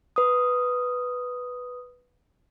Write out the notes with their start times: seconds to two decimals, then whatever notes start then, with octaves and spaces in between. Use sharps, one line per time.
0.16 B4 D#6